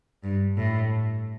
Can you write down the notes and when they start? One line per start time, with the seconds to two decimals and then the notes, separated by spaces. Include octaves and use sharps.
0.24 G2
0.57 A2